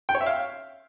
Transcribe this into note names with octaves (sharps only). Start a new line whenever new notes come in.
G5
C#5
E5
F5